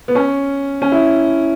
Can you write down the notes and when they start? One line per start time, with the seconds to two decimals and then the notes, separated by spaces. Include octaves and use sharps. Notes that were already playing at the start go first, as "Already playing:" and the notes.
0.08 B3
0.15 C#4
0.82 C#4
0.92 E4